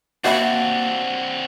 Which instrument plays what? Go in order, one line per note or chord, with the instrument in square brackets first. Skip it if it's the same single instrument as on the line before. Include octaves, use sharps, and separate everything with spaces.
[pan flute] A#3 [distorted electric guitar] C4 D4 [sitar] F#4 [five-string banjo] G4 E5 B5